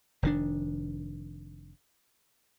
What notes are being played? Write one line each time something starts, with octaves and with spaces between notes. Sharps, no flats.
F1 D#3 D4